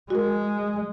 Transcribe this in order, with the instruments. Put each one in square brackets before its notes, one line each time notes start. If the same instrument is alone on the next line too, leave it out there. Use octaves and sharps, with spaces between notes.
[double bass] G#3 [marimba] F#4 A#4